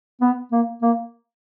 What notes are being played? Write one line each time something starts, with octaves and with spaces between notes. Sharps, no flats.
B3
A#3
A#3